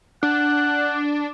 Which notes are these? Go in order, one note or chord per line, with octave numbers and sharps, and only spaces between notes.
D4 F#5